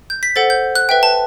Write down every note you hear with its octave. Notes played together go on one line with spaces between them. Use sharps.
G6
B6
A4 C5 F#5 A6
G6
F#6
B4 E5 G5
A5